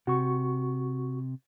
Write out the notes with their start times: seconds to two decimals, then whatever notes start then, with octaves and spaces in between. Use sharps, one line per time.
0.07 C3 F#4 C#6